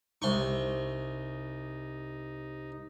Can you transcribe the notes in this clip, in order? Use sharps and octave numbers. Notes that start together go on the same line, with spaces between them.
C2 D#4 C6 C#6